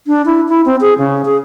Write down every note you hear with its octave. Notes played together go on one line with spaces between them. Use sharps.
D4
E4
E4
C4
G#4
C#3
G#4